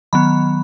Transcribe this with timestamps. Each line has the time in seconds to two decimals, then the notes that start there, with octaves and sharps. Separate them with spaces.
0.13 D#3 F#3 B3 B5